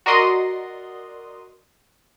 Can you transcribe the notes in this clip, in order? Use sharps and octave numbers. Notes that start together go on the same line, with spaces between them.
F#4 A#4 D5 D#5 C6 D#6